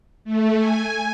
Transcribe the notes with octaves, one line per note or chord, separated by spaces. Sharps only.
A3
G#5